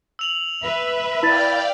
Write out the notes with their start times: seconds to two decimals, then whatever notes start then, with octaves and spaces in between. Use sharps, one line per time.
0.19 E6 F7 F#7
0.64 B4 E5
1.23 E4 D5 F5 G5 B5 A6